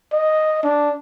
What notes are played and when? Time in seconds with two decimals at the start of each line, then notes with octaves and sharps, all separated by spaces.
0.12 D#5
0.64 D4